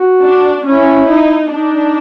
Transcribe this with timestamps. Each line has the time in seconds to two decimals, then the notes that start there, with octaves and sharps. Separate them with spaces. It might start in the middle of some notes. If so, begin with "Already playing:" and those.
Already playing: F#4
0.22 D4
0.65 C#4 E4
1.08 D#4
1.51 D4 D#4